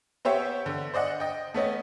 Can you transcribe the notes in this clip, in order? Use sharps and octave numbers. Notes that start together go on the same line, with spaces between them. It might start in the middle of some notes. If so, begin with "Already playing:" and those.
B3 G4 C5 C#5 E5 G5
D3
C5 D5 D#5 F#5
D#5 G5
A3 B3 C#4 D#5